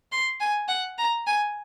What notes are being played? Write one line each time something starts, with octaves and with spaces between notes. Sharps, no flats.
C6
G#5
F#5
A#5
G#5